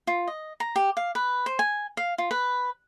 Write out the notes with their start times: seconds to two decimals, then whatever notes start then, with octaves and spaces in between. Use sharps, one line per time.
0.07 F4
0.28 D#5
0.60 A#5
0.76 G4
0.97 F5
1.15 B4
1.46 C5
1.59 G#5
1.97 F5
2.18 F4
2.31 B4